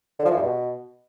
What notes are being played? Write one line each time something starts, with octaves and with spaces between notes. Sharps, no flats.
D3
F3
E3
G2
B2